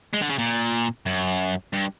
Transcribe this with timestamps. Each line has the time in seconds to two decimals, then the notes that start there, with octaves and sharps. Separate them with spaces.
0.13 G#3
0.21 D3
0.29 C#3
0.39 A#2
1.06 F#2
1.73 G2